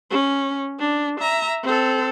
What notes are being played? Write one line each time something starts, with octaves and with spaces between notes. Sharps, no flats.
C#4
D4
E5 A#5
C4 A4